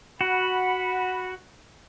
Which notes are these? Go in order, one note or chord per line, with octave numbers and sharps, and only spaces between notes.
F#4 F#5 B5